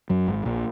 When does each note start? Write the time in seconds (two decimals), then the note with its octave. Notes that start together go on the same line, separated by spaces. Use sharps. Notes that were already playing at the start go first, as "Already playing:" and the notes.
0.10 F#2 F#3
0.27 G#1 G#2
0.45 A#1 A#2